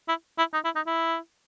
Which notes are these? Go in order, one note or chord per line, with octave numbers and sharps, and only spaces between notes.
E4
E4
D#4
E4
D#4
E4